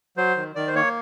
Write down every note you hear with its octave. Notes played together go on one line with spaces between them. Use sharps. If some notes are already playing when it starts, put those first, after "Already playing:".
F#3 C5
D#3
D#3 D5
C5
A#3 C#5